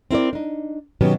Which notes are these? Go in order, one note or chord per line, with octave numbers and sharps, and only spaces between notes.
C4 E4 A#4 D5
D4 D#4
B2 D#3 F#3 B3 C#4 G4